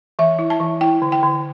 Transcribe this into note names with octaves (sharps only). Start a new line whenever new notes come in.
E3 E5
E4
A5
E3
E4 G5
D3
G5
D3